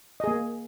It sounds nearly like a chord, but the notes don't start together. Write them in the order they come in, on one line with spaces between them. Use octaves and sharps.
D#5 G#4 A#3